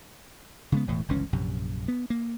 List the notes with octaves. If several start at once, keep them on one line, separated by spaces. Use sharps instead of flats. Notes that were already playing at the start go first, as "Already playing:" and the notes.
C#3 G#3 B3
E1 A2 E3
G1 C#2 E3 C#4
A#1 F#2 C3
B3
A#3